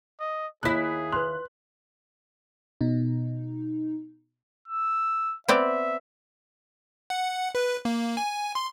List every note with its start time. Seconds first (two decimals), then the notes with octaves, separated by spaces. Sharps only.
0.20 D#5
0.63 D#2 E4 G#4 F#6 B6
1.12 B4 C6 F#6
2.81 B2 D#4
4.68 E6
5.48 B3 C4 D5 E5
7.10 F#5
7.55 B4
7.85 A#3
8.17 G#5
8.55 C6